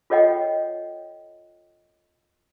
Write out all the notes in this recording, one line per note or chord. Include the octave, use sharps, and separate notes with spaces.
F4 A4 C#5 D#5 F#5 G5